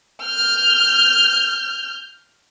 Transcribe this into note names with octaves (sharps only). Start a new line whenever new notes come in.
F6 G6